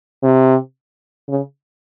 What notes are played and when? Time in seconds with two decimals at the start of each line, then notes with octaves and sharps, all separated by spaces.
0.23 C3
1.28 C#3